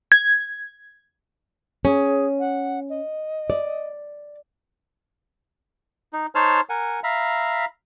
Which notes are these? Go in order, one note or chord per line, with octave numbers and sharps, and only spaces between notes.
G#6
C#4 G#4
F#5
D#5
D5
D#4
D#4 C5 C#5 A5 C6 F6
A#4 F#5 G#5
E5 F5 A#5 B5